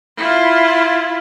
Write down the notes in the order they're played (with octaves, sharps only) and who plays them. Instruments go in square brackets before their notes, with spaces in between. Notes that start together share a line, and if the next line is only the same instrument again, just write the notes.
[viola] E4 F4